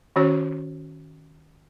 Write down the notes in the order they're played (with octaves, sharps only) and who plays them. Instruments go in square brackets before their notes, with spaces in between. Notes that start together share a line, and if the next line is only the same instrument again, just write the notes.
[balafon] D#3 C#4 F#4 C#5